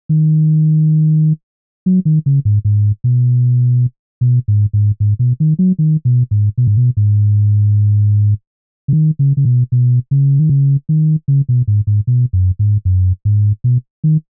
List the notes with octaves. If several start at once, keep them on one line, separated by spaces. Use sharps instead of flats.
D#3
F#3
D#3
C#3
G#2
G#2
B2
B2
G#2
G#2
G#2
B2
D#3
F#3
D#3
B2
G#2
B2
G#2
B2
G#2
C#3
D#3
C#3
C#3
B2
B2
C#3
D#3
C#3
D#3
C#3
B2
G#2
G#2
B2
F#2
G#2
F#2
G#2
B2
D#3